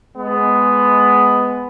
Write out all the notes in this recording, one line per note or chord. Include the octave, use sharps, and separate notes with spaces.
G#3 B3